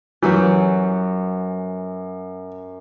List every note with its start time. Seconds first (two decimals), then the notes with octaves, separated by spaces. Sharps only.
0.22 F#2 E3 F#3 G6